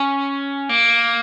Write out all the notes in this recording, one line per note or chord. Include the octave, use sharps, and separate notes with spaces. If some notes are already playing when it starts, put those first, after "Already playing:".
Already playing: C#4
A#3